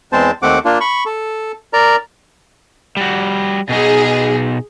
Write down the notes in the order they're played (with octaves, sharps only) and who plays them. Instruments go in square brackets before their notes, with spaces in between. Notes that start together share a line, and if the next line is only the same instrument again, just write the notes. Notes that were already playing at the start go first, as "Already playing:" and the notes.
[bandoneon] E2 G#3 C4 C5 A5
D#2 A3 C4 F#5 D6
A#3 D4 F4
B5 C#6
A4
A#4 D5 A#5
[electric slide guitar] G3 F#4
[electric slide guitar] B2 D#4 [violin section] G#4